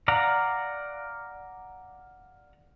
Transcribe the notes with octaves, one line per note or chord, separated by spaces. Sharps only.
D5 F5 F#5 A#5